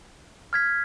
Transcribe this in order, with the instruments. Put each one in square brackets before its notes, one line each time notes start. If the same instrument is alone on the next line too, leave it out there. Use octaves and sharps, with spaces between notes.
[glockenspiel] F6 G#6 B6